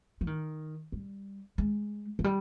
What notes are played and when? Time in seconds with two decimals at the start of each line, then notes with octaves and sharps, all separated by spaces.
0.21 F3
0.27 D#3
0.92 G3
1.58 G#3
2.19 F3
2.24 G3